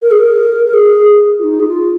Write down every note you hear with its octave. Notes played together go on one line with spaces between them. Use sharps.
A#4
G#4
A#4
A#4
G#4
F4
D#4
G#4
F4